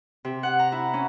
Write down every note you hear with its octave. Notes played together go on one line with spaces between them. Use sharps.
C3
F#5
A#5
E4
C#4